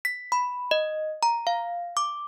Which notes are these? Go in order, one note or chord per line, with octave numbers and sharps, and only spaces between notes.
B6
B5
D#5
A#5
F5
D6